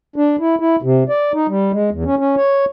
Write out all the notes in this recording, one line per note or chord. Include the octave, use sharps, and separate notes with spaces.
D4
E4
E4
C3
D5
D#4
G3
G#3
E2
C#4
C#4
C#5